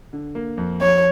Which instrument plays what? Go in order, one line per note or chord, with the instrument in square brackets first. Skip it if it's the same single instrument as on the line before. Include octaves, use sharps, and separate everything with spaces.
[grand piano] D3
A#3
F2
[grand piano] F2 [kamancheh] C#5